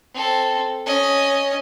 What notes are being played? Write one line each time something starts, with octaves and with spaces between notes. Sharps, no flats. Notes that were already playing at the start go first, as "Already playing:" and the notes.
C4 A4
C#4 D#5